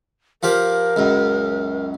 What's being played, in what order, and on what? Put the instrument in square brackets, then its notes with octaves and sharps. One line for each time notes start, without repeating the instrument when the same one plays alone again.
[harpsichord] F3 F4 G4 [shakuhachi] A#4
[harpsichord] C#2 F#2